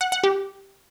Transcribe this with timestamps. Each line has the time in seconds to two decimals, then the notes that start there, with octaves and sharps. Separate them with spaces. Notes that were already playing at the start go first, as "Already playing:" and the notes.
0.01 F#5
0.12 F#5
0.24 G4